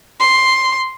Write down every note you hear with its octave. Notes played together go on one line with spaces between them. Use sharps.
C6